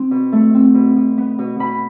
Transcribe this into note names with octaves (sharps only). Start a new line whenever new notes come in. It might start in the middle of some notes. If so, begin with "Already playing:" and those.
Already playing: C4
B2
A3
C4
B2
B2
B3
B2
B2 B5